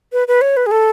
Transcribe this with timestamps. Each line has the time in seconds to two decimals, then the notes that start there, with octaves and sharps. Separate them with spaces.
0.13 B4
0.28 B4
0.41 C#5
0.57 B4
0.66 G#4
0.71 A4